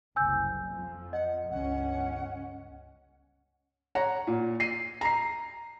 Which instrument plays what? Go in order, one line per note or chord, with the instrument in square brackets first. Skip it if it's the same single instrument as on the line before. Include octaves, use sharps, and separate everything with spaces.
[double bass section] F#1 C2 [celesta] G#5 E6 G6
[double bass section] F2 F3
[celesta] D#5 [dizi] F#5
[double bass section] G1 C#2 C#4 [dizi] F#5
[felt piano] C#5 F#5 A#5
A#2
C7 D#7
A#5 C7